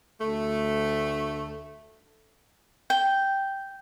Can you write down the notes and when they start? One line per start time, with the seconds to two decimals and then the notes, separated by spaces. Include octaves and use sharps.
0.21 D2 A3
2.90 G5